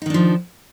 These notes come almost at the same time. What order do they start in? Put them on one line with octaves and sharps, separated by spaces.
D#4 D#3 D4 F3